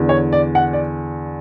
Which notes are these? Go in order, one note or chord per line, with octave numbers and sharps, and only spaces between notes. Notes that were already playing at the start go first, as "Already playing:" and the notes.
Already playing: E2 D3
C#5
D5
F#5
D5